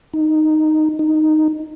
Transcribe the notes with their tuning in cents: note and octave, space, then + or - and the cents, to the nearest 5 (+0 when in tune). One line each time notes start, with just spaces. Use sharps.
D#4 -5
D#4 -5